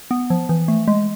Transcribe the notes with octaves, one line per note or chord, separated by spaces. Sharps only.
B3
F3
E3
A3
G#3